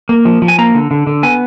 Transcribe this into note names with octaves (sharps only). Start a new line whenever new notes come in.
A#3
F3
F3
G#5
A#3 A#5
D3
D3
D3
B3 G#5